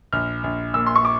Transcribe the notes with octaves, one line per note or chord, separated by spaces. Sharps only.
A#1 F6
A#1
A#2 E6
C6
C#6
D6